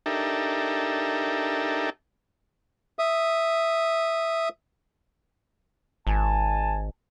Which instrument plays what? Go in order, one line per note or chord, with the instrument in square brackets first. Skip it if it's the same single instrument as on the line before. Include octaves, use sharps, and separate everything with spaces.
[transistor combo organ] D4 D#4 G4 A4 A#4 E5
[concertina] E5 D#6
[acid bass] G#1 [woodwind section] G#5 A5